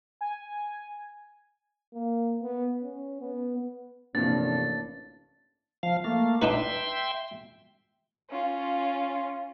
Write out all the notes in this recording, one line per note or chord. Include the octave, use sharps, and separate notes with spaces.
G#5
A#3
B3
C#4
B3
A1 G2 C3 F3 A#3 D4 A6
F3 F5
A3 A#3 F5
D4 D#4 B4 E5 G5 C6
C#4 F4